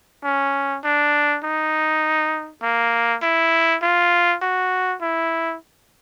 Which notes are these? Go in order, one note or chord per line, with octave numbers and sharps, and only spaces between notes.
C#4
D4
D#4
A#3
E4
F4
F#4
E4